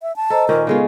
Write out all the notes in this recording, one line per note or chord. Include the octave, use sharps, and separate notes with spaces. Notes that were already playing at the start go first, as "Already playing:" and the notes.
E5
A5
A4 C5 D#5 A#5
A#2 D#3 C#4 A#4
C#3 G#3 B3 F4 G#4 A4